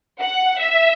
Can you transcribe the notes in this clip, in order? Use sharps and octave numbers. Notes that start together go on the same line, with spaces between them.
F#5
E5